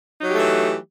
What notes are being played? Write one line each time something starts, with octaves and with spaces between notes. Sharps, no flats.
E3 F#3 A3 D#4 G4